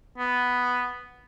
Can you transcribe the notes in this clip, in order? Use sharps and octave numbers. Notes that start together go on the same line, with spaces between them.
B3